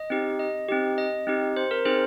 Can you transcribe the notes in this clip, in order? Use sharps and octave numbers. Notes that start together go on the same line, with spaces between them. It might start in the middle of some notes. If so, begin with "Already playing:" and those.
Already playing: D#5
C4 D#4 G4
D#5
C4 D#4 G4
D#5
C4 D#4 G4
C5
A#4
C4 D#4 G#4 C5